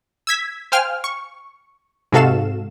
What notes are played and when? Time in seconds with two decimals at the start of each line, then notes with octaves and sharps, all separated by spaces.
0.27 E6 G#6 B6
0.72 C5 F5 G5 G#5 F6
1.04 C#6
2.12 G#2 C3 F#4 A4 F5 E7